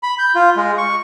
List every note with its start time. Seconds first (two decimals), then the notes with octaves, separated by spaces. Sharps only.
0.03 B5
0.19 G6
0.35 F4
0.56 G#3
0.78 C#6